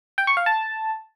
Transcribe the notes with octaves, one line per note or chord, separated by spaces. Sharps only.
G5
C#6
F5
A5